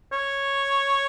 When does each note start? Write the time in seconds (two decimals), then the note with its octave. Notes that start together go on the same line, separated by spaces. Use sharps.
0.12 C#5